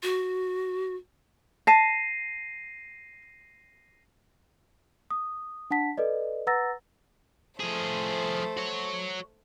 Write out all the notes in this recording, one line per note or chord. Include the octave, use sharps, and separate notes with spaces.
F#4
A5 A#6 C7 D#7
D#6
D4 F#5 A5 B6
A4 B4 D5 D#5
B4 F#5 A#5 E6 A6 A#6
F3 A3 G#4 C5
F#4 C#5